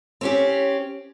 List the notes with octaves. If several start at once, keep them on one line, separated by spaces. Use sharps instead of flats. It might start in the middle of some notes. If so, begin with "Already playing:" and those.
C4 C#4 G4